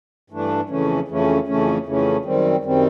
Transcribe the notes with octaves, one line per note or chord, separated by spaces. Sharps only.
G2 E3 A3 D4
F2 C#3 E3 A3 C#4
F2 C#3 E3 A3 C#4
F2 C#3 E3 A3 C#4
F2 C#3 E3 A3 C#4
F#2 D#3 G3 C4
F#2 D#3 G3 C4